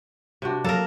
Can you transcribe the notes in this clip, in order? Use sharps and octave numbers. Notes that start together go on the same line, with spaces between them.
C3 D4 F#4
F#3 A#3 A4 A#4